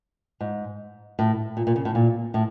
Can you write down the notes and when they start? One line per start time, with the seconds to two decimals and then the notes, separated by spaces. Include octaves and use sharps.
0.41 G#2
1.19 A2
1.57 A#2
1.67 A#2
1.76 C#3
1.85 A2
1.95 A#2
2.34 A2